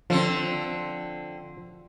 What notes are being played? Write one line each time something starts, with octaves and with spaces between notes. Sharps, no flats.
D3 F3 C4